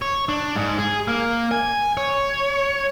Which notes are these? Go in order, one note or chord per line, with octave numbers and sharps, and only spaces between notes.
C#5
D4
G#2
G#4
A#3
G#5
C#5